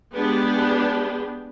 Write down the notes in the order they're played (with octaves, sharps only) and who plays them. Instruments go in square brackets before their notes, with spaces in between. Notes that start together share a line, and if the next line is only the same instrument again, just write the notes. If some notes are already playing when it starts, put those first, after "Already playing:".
[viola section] G#3 B3 D4 G4 G#4